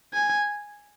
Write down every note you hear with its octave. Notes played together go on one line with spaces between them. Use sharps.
G#5